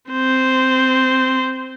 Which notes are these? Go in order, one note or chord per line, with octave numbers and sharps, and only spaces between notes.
C4 C5